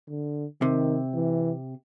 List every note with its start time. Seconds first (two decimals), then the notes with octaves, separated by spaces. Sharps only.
0.09 D3
0.61 C3 D#3
1.15 E3